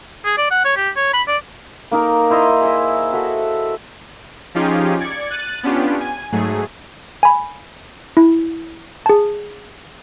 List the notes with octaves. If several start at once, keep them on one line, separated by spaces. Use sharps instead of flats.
G#4
D5
F#5
C#5
G4
C#5
B5
D5
A#3 D#4 A#4
E4 C5 D#5 A#5
G#4 E5
F#4 A4 E5
F3 C#4 D#4 F4 G4 G#4
D5 G#6 C#7
F#6 A6 D#7
B3 C#4 D4 F4 G4
G#5
G#2 F#3 A3 G#4
G#5 B5
E4
G#4 A5